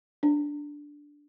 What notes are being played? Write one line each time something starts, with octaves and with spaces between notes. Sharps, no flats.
D4